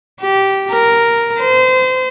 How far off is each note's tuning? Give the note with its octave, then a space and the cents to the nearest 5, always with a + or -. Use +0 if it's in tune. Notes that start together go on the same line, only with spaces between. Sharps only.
G4 -15
A#4 +0
C5 -30